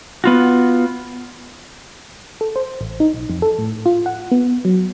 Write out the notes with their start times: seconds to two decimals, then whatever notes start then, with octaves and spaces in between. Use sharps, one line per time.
0.24 B3 F4 F#4
2.41 A4
2.56 C5
2.81 A1
3.00 D#4
3.14 B1
3.30 F2
3.42 A4
3.58 A2
3.86 F4
4.06 F#5
4.32 B3
4.65 F#3